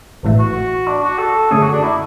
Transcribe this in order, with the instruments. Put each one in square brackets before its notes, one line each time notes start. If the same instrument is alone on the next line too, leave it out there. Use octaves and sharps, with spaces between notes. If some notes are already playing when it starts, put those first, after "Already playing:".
[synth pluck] A1 A2 E3 A3
[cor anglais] F#4
D4
F#4
A4
[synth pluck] F#2 D3 A3 C#4 [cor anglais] G#4
[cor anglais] F#4
D4
E4